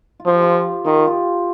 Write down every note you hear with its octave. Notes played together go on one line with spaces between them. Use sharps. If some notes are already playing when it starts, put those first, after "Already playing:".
F4
F3 G4
F4
D#3 F4
G4
F4